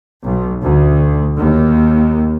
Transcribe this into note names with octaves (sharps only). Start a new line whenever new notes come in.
B1
D2
D#2